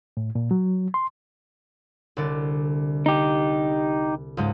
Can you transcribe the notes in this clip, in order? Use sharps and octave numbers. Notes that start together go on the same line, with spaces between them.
A2
A#2
F#3
C6
C2 D3 D5
D#4 G4
C#2 G#2 G#3